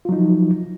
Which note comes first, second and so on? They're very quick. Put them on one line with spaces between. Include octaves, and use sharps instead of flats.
F4 F#3 D#4 F3